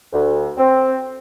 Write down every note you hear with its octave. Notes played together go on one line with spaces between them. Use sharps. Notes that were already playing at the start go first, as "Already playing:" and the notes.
D2
C4